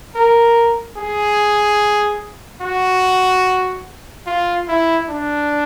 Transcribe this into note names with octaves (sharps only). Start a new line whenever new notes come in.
A#4
G#4
F#4
F4
E4
D4